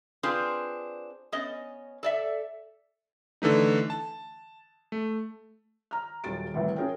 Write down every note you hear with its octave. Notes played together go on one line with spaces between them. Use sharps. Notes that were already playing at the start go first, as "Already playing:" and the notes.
C4 D4 F4 G#4 B4 C5
B3 C#4 D#5
A4 D5 E5
D3 E3 A3 D#4
A5
A3
A#5 F6
D#1 D#2 F#3 A6 D7
C2 A2 E3
C#4 F#4 G#4 A#4 C#5 G5